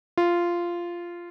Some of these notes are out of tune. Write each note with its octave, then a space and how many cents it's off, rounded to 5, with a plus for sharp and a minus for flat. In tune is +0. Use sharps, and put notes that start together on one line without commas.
F4 -10